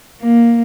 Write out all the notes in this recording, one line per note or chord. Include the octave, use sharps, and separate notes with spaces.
A#3